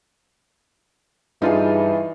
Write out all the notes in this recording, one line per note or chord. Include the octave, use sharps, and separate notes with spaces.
G2 E3 D#4 F4 G#4